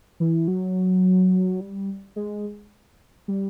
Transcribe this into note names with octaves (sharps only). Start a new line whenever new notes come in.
E3
F#3
G3
G#3
G3